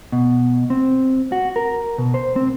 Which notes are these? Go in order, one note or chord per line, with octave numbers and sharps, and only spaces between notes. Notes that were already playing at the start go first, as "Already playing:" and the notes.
B2
C4
F#4
A#4
B2
C5
C4